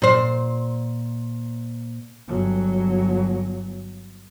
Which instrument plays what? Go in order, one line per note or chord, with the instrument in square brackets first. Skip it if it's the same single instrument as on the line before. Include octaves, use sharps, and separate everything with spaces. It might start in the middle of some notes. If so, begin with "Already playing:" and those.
[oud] A#2 C5
[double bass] G1 F#3